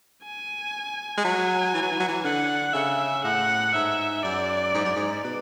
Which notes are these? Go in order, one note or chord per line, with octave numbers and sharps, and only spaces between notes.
G#5
G#3
F#3 G#5
E3
F#3
E3
F#3
E3
D3 F#5
C#3 E5
A2 F#5
G#2 E5
F#2 D5
G#2
F#2
G#2
B2